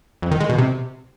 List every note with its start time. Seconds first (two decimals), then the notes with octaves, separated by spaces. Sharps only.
0.22 F2
0.31 D#3
0.40 G#3
0.49 B2
0.58 C3